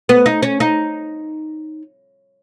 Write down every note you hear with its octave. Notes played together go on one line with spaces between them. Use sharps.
B3
D#4
C#4
D#4